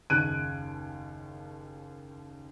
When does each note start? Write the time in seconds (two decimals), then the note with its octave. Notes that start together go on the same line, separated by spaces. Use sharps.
0.10 F#1 D#2 F#6 G#6 D7 D#7